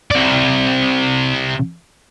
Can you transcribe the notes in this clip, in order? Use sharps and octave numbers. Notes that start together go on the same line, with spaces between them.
C3 D5